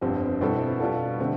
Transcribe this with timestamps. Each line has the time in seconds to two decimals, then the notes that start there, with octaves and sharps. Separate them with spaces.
0.01 G1 F2 D3 G3 C4
0.41 B2 G3 C4 E4 A4
0.80 B2 G3 D4 F4 A4
1.20 D3 A3 C4